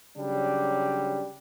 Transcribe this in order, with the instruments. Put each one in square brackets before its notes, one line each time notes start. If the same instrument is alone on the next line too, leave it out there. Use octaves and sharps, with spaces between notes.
[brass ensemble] C#3 F#3 G3 D4